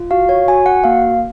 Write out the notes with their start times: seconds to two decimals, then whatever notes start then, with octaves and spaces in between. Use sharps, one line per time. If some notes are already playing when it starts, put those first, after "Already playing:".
Already playing: F4
0.11 F#4 F5
0.29 C#5
0.48 F#4 G#5
0.66 F#5
0.84 A#3 F5